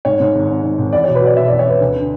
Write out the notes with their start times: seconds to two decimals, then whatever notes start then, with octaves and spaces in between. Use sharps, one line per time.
0.05 G#2 C#5
0.20 G#2
0.35 G#1
0.49 G#1
0.64 G#2
0.78 G#1
0.93 E2 D5
1.04 B2 C#5
1.15 B4
1.22 F#3 D5
1.36 B2 E5
1.47 E2 D5
1.59 C#5
1.66 E2 B4
1.81 D2
1.96 D3